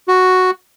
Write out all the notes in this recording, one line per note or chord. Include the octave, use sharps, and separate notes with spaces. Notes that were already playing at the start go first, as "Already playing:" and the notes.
F#4